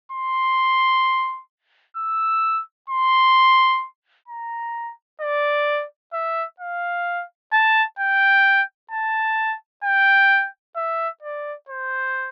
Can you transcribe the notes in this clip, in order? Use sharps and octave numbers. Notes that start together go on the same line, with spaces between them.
C6
E6
C6
A#5
D5
E5
F5
A5
G5
A5
G5
E5
D5
C5